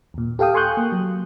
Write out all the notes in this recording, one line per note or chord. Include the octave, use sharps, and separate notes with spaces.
D#2 A#2
G4 A4 F5 G5 D#6
G#5 C6 C#6 D#6 F#6 G6
A#3
F#3